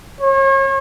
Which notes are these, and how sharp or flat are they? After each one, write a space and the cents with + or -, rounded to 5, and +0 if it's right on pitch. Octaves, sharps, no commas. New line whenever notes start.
C#5 -35